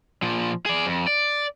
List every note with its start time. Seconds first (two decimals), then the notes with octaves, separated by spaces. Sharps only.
0.22 A#2 F3
0.66 G#4 D5
0.86 F2
1.07 D5